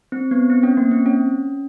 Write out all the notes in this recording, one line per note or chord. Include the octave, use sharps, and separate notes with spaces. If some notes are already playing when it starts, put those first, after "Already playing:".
C4
B3
C4
C#4
A#3
C4
C#4